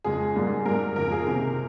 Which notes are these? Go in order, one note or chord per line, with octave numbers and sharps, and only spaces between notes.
F2 C#3 G#3 G#4
G#2 G3 A#3
G#2 G3 A#3 A#4
F2 C#3 F3 A#3 A#4
G#4
C3 D#3 A#3 A#4